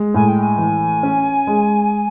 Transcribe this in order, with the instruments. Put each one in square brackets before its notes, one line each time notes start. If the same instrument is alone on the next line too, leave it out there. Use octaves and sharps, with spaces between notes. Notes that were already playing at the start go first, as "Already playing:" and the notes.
Already playing: [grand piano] G#3
[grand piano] A2 [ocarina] G#5
[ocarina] G5
G#5
[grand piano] E3
C#4
G#3